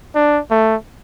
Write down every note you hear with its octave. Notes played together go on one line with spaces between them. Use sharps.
D4
A3